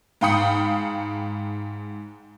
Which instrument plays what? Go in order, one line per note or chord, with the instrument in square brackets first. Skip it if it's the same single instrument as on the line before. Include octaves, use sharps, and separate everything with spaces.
[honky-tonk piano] G#2 F5 G5 B5 D#6 C#7